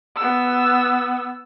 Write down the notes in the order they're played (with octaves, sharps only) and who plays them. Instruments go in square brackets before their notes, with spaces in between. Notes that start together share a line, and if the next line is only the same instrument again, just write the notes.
[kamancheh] B3 E6